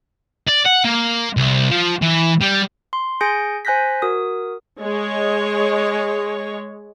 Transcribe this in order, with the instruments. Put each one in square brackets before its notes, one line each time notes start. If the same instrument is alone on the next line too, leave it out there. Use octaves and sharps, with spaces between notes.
[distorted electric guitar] D5
F#5
A#3
C2
F3
E3
G3
[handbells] C6
G#4 G#5 G6 A#6 C#7 D7
C5 G#5 F#6 G6 A#6 B6
F#4 A#4 D#6
[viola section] G#3 C#5